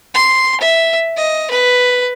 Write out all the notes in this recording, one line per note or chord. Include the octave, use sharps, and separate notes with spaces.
C6
E5
D#5
B4